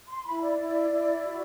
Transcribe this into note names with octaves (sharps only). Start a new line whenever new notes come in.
C6
E4 B5
D5
E4
E4
F#4